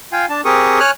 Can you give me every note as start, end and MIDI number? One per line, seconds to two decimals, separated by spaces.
0.12 0.26 65
0.12 0.26 77
0.12 0.26 79
0.12 0.26 80
0.30 0.41 62
0.30 0.41 81
0.45 0.79 60
0.45 0.79 67
0.45 0.79 68
0.45 0.79 70
0.45 0.79 85
0.45 0.79 87
0.80 0.91 73
0.80 0.91 80
0.80 0.91 89
0.80 0.91 90